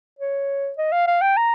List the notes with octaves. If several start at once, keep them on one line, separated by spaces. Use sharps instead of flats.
C#5
D#5
F5
F5
G5
A#5